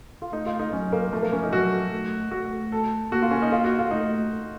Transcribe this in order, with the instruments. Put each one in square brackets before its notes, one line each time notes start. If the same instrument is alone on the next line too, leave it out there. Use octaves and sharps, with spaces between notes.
[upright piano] F4
[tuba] A3 [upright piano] D#4
[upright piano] F4
D#4
[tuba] F#3 [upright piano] C#4
[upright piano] A#3
[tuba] F3 [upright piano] A3
[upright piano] A#3
C#4
D#4
[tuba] F#3 [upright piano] F#4
[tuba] A3
[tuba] A3 [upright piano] F#4
[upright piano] A4
[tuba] A#3 [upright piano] F#4
[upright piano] F4
C#4
D#4
F4
F#4
F4
[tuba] A3 [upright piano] D#4